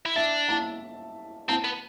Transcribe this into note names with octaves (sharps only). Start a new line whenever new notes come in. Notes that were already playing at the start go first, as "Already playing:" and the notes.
E4
D4 E5
A5
C4 A5
B3